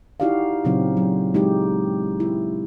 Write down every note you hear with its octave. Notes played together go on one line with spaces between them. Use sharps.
D#4 E4 F#4 G4 D5 F5
A#2 C#3 F#3 C4 D#4
F#3
G#3 D#4 E4 G4
E4